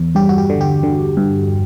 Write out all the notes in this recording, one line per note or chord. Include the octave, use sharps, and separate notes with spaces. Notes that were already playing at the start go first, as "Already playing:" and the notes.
Already playing: E2
G2 G4
F#4
G4
D3
G4
D3
G2